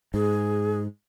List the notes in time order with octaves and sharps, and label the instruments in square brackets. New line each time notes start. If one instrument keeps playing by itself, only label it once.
[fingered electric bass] G#2 [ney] G#4